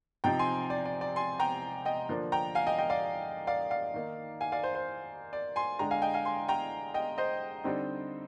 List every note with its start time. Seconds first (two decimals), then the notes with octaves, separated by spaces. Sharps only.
0.24 C3 F3 C4 D#4 G5 A#5
0.39 G#5 C6
0.70 D5
0.85 D5
1.01 D5
1.16 G#5 C6
1.40 G5 A#5
1.85 D#5 G5
2.09 D3 F3 A#3 D4
2.32 G5 A#5
2.55 F5 G#5
2.67 D#5 G5
2.78 D#5 G5
2.90 D5 F5
3.47 D5 F5
3.71 D5 F5
3.94 D#3 A#3 D#4
4.41 F5 G#5
4.52 D5 F5
4.63 C5
4.75 C5
5.33 D5
5.56 G#5 C6
5.79 D3 G#3 D4 G5 A#5
5.91 F5 G#5
6.02 D#5 G5
6.14 F5 G#5
6.25 G#5 C6
6.48 G5 A#5
6.94 D#5 G5
7.18 C5 D#5
7.64 D3 G3 C4 D#4